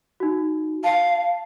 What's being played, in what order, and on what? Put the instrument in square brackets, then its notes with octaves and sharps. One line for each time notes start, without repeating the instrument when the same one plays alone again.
[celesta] D#4 F#4
[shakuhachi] F5 [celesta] A5